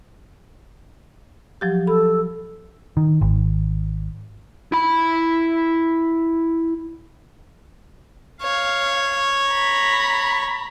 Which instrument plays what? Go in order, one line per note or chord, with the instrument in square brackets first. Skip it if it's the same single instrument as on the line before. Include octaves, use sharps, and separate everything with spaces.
[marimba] F3 F#3 G4
[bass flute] A4 [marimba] B5
[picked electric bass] D#3
G#1
[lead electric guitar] E4 B5
[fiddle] C#5 [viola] F5
[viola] A#5 B5